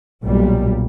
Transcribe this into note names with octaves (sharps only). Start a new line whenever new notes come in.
B1 A#2 G3